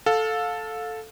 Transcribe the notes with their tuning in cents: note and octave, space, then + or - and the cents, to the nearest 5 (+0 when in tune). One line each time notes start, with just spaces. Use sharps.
A4 +0 F5 +25